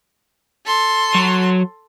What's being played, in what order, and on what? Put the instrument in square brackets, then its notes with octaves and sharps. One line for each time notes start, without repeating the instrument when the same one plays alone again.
[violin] A4 C6
[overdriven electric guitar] F#3